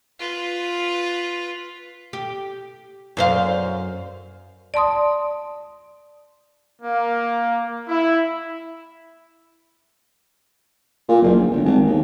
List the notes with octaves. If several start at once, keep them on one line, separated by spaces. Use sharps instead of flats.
F4 B4
G4
F#2 C5 F5
D5 A5 C6 D#6
A#3
E4
A#2
F#1
A#1
G1
G#1
D#2